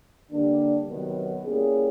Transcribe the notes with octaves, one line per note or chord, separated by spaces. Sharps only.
D3 G3 A#3 D4
C3 D#3 F#3 B3
G3 A#3 C#4 E4 G#4